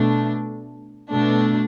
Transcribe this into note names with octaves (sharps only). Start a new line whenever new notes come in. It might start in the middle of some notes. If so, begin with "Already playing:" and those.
Already playing: B2 A3 D4
B2 A3 D4